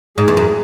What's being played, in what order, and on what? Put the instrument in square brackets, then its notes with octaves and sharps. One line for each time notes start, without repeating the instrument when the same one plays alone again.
[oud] G#2 [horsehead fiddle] G#4
[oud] E2
F#2